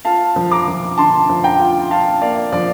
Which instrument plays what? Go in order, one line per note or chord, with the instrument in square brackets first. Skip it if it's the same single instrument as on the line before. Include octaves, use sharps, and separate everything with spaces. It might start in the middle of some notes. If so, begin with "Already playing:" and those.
[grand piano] F4 F5 A5
F3
A#5 D6
F3
D3 A5 C6
F3
G5 A#5
F4
F4 F5 A5
A#3 D5 F5
F3 D5